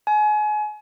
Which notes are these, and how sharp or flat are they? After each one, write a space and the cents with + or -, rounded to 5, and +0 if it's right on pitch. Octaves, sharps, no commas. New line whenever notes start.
G#5 +30